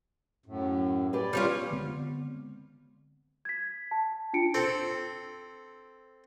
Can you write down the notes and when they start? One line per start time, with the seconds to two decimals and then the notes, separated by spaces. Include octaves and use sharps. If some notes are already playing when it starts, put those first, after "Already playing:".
0.46 F#2 A2
1.13 G4 G#4 B4 D5
1.33 G3 C#4 F4
1.71 D3 G#3 B3 C4
3.45 G#6 B6
3.91 A5
4.33 D4 F4 C#7 D7
4.54 C4 A4